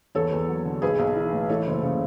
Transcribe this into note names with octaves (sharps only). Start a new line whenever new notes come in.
E2 A4 C#5
E2
F#3
D3
B1 G#4 B4
B1
E3
A2
E3 A4 C#5
F#1
C#3